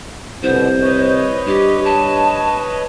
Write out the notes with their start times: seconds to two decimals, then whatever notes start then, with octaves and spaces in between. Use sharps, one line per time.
0.43 C2 B2 D3 B3 C5
0.82 B4 C#5 D#5
1.47 G2 G4
1.85 A5